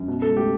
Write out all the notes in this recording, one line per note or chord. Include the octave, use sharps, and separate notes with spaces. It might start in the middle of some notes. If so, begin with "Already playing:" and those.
Already playing: F#2
B2
C#2 A4
A3 G4